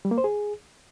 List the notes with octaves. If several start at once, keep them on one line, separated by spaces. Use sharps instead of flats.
G3
A#3
C5
G#4